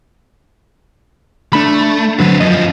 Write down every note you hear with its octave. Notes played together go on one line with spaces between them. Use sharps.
A3 D4 B5
D3 F#3 C4 B4
F#2 F3 D#5